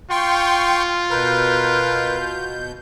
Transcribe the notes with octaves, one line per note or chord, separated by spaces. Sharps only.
F4 G5 C6 C#6
B2 A#4 B4 G6